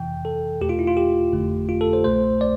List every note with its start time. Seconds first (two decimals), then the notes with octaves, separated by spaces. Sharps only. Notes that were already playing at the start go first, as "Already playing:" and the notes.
Already playing: F2 C3 E3 G5
0.25 A4
0.61 E2 B2 A3 G4
0.69 F4
0.79 E4
0.87 F4
0.97 G4
1.32 G1 F2 D3 A3
1.69 F4
1.81 A4
1.93 C5
2.04 C2 B2 A3 C5
2.41 D5